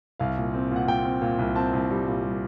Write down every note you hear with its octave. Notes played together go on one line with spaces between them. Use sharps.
C2 F5
A#2
C4
A#2 F#5
A#2 G5
C4
A#2
C2
C4 A5
C2
G3
A#2
G3